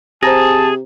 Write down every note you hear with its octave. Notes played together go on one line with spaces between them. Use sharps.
C3 G#4 C5 A5 A#5 A#6